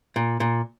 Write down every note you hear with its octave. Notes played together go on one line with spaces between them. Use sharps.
A#2
A#2